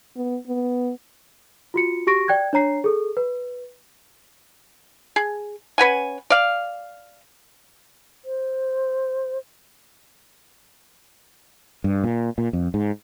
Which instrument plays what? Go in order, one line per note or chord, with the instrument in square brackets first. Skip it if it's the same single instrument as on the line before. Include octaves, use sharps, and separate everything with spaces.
[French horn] B3
B3
[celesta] F4 F#4 C#7
F#4 G4 C#6 A#6 D7
D5 G5 F#6 G#6
D4 C#5 A#5 C7
G#4 A4
B4
[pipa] G#4
C#4 B4 F#5 G#5
D5 F5
[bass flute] C5
[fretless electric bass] G2
A#2
A#2
F2
G#2